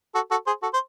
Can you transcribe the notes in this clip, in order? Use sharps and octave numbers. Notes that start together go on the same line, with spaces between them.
F#4 A4
F#4 A4
G#4 C5
F#4 A4
C5